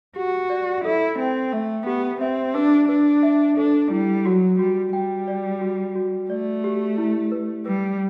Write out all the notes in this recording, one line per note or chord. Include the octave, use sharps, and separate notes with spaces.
F#4 G4
D5
E4 A4
C4 G5
A3 E5
B3 G4
C4 E5
D4 B4
D4 B4
E5
D4 A4
G3 E4
F#3 F#4
G3 F#4
G3 G5
D5
F#4
F#4
A3 D5
G4
E4
B4
G3 B4